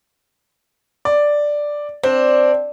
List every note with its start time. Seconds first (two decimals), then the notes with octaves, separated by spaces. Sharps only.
1.05 D5
2.04 C4 D4